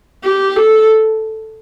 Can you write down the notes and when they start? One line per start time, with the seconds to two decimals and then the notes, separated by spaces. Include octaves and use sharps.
0.24 G4
0.56 A4